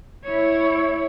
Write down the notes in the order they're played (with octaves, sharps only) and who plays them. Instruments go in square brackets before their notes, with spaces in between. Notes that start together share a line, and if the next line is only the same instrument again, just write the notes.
[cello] E4 C#5